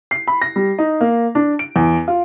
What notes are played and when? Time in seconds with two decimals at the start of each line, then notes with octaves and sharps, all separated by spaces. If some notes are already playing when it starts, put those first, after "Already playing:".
0.11 C7
0.28 B5
0.42 A#6
0.56 G3
0.78 D#4
1.01 A#3
1.35 D4
1.59 D7
1.76 E2
2.08 F4